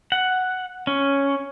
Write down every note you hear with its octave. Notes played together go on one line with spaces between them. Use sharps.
F#5
C#4